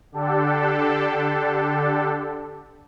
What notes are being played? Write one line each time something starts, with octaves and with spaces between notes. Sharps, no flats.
D3 D4 G4 A4